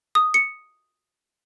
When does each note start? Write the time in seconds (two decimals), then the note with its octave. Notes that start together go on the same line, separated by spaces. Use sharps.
0.15 D#6
0.34 C#7